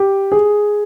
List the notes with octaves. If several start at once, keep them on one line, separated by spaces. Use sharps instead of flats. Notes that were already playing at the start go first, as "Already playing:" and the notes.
Already playing: G4
G#4